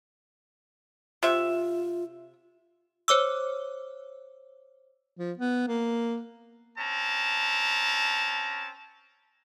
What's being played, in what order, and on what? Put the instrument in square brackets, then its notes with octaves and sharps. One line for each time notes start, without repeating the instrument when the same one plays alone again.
[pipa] C3 E5 [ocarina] F4
[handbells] C5 C#5 D6 E6
[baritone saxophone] F3
B3
A#3
[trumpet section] C4 C#4 A5 A#5